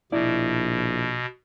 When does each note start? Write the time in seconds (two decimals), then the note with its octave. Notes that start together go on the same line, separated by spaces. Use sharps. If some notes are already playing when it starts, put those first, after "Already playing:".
0.12 A#1 B2 E4 D5